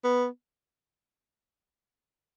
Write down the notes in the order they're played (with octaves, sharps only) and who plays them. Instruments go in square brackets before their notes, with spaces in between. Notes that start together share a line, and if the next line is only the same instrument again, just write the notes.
[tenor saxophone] B3